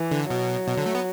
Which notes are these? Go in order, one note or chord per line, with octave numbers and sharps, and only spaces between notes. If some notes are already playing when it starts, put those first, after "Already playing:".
Already playing: E3
D3
B2 F#3
B2
D3
A3
B3